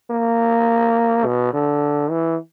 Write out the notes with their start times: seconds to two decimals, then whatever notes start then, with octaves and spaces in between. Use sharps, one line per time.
0.11 A#3
1.25 B2
1.53 D3
2.11 E3